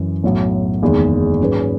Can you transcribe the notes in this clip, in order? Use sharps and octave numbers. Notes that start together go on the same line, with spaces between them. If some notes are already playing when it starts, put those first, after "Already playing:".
Already playing: F#2 E3
B1 A2 F#3
F#1 E2 D#3 G#3
G#2 F#3 C#4 G#4 B4